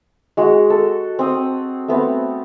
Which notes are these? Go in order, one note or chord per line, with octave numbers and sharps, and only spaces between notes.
G#3 F#4
A4
C4 D#6
A3 B3 C4